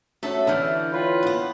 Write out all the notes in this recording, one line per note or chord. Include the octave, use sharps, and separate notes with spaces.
A3 C#4 D4 F#4 A4 C#5
D3 E3 D4 F6 G6
F4 B4 C#5 G5
E2 B3